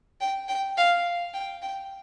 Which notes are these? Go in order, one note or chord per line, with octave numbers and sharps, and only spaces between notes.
G5
G5
F5
G5
G5